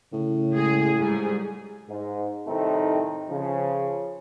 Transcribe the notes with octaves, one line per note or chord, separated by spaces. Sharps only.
A2 C#3
G#3 G#4
G#2 G3 G#4
G#2
C2 A2 D#3 A3 C4 D#4
C#3 F3